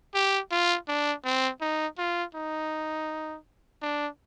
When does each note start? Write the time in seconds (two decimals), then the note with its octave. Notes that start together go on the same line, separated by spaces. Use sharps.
0.15 G4
0.51 F4
0.88 D4
1.25 C4
1.61 D#4
1.98 F4
2.35 D#4
3.82 D4